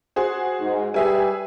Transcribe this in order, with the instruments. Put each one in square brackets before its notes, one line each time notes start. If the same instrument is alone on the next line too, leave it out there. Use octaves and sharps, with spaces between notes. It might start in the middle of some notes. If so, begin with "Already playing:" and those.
[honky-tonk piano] F#4 G#4 C5
[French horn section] G#2
[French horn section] G3 G4 B4 [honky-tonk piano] G#4 E5 G#5